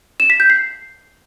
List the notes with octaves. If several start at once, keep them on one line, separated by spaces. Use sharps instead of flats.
E7
B6
G6
C7